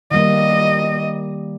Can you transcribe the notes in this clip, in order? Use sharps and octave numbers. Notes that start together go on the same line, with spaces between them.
D#3 G3 A#3 D#5